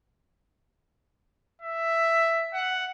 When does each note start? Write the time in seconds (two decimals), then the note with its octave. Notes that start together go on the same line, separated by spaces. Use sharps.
1.62 E5
2.54 F#5